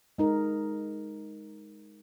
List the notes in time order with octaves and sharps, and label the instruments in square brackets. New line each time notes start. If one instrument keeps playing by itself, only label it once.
[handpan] G#3 D#4 A#4